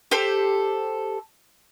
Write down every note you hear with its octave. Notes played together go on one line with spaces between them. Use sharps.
G4 A4 C5